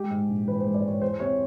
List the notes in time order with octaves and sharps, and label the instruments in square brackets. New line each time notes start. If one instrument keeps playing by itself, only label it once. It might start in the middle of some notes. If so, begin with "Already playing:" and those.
Already playing: [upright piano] G#3 G4
G#2
A#1
E3 B4
C5
G#3
D5
G#2 C#5
E2 C5
C3 C#5